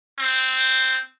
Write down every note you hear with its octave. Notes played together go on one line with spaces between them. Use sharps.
C4